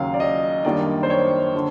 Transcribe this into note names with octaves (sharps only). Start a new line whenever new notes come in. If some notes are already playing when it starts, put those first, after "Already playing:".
Already playing: D#2 C#3 F#3 F5
D5
D#5
F#2 D#3 G3 A#3 D4 D5
C5
C#5
D3